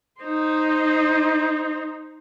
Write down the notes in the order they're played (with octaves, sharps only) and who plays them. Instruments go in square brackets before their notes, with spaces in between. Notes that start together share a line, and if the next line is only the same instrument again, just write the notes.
[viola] D#4 C5